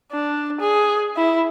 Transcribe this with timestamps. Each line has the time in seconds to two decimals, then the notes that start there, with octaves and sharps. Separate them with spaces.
0.12 D4
0.61 G#4
1.16 E4